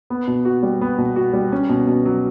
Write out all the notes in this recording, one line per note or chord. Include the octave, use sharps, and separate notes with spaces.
B3
B2
F#4
G3
B3
B2
F#4
G3
C#4
B2
B2
F#3